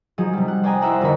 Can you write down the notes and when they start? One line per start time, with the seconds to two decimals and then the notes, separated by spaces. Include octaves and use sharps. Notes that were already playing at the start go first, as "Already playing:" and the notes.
0.18 F3 F#3 D#4 G#4
0.33 C3 G3
0.48 F#5
0.63 C5 D5 G5 G#5 A#5 D#6
0.81 E4 C5 E5 F#5 A#5
1.01 F2 D3 D#4 A#4 B5